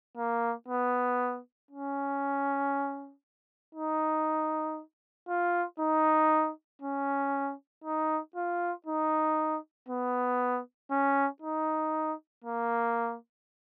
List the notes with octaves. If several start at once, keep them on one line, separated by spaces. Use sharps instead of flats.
A#3
B3
C#4
D#4
F4
D#4
C#4
D#4
F4
D#4
B3
C#4
D#4
A#3